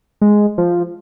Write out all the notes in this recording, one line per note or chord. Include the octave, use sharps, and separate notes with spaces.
G#3
F3